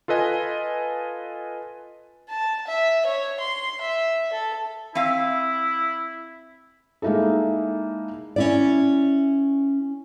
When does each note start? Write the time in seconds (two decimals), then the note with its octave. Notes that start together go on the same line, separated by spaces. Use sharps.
0.08 F4 A4 B4 D#5 G#5
2.29 A5
2.67 E5
3.06 C#5
3.40 C6
3.81 E5
4.33 A4
4.95 C4 E4 E5 F5
7.02 G#3 A#3 D#4 E4 A4
8.36 C#4 E4 D5